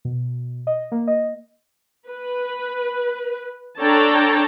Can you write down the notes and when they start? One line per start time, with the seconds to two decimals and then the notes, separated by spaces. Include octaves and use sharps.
0.05 B2
0.67 D#5
0.92 A#3
1.07 D#5
2.09 B4
3.80 D4 A4 C#5 G5 A5 A#5